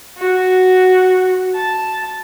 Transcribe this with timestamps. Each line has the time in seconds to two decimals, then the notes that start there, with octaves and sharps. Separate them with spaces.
0.17 F#4
1.55 A5